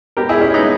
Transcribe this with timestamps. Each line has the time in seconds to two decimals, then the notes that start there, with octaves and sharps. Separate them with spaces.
0.17 B2 G4 A#4
0.29 E4 G#4
0.41 C#4 E4
0.54 B3 D#4